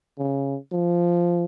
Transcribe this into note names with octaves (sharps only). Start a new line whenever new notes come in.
C#3
F3